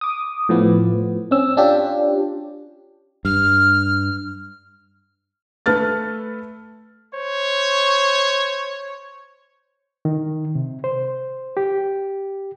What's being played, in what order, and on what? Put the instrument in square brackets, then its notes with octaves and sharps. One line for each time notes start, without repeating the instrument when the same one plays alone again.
[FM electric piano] D6 D#6
A2 F3 B3
C4 C#4 E6
C#4 D4 F4 G4
[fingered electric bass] G2 [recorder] F6
[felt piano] A3 A4 B4 F6 A6
[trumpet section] C5 C#5
[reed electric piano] D#3
C3
C5
G4